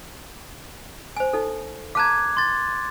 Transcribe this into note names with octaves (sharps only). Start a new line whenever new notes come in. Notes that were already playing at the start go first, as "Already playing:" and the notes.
C5 G#5
D#4 A4
F5 A5 A#5 D6 F#6 G#6
C6 A6